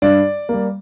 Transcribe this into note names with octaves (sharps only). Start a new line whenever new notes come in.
G2 D5
G3 A#3